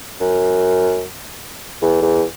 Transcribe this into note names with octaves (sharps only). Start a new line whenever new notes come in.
F#2
E2
E2